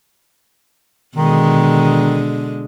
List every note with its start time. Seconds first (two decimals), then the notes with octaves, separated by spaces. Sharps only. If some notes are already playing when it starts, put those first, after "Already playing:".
1.16 B2 D3 D#3 G#3